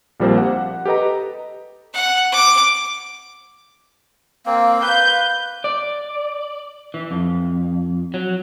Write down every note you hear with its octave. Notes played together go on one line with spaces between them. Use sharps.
A#1 F3 G3 A#3 C4 C5
F#5
G4 A4 B4 D#5 A#5
F#5
D6
A#3 C4 F5
B4 G6
D5
E3
F2
F#3